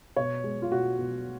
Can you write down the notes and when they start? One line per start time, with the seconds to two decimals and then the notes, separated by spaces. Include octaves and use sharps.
0.17 B2 C#5
0.44 G#3
0.62 F4
0.71 B2 F#4
0.99 B2